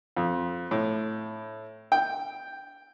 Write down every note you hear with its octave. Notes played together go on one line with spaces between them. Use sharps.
F2
A2
G5